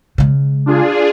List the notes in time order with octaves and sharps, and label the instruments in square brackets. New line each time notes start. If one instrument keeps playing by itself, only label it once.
[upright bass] C#3 G#3
[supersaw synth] D4 F4 G#4